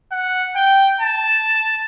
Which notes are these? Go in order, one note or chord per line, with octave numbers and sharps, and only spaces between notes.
F#5
G5
A5